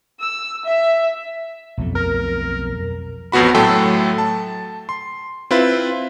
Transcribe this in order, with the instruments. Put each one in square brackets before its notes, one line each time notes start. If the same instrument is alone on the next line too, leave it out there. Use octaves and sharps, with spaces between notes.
[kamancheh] E6
E5
[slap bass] B1 F2 A3
[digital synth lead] A#4
[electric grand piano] A1 F2 B3 F#4 B5
A2 F#3 A3 A4 G5 C6
A5
C6
C4 E4 F4 B4